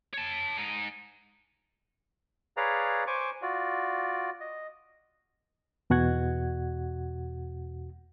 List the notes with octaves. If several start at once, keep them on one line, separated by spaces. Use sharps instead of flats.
C#5 A5
G#2 D#4
G#4 B4 C#5 D5 F5 A#5
C5 G#5 C#6 D6
F4 F#4 D5
D#5
E2 B2 F#4 F#5 G#6